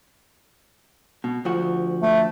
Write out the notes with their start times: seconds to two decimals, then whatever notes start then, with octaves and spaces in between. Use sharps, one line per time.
1.24 B2
1.45 D2 F3 F#4
2.02 A3